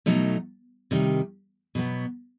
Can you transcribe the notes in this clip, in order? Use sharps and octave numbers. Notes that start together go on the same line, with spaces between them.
B2 F#3 A3 D#4
C3 D#3 G3 D#4
B2 F#3 B3